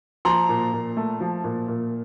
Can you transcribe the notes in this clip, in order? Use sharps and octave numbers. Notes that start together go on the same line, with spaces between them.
F3 A#5 C6
A#2
A#2
A3
F3
A#2
A#2